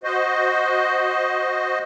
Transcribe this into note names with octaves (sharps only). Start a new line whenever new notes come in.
F#4 C5 D#5